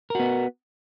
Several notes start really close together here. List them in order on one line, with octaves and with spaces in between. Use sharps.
A#4 F#4 B3